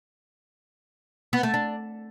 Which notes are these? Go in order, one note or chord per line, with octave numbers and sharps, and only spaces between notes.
B3
A3
D4